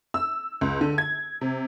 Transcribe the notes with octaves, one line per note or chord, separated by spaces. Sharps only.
E6
C#2
D3
G#6
C3